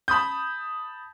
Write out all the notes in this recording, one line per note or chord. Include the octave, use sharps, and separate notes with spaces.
A5 B5 D#6 G6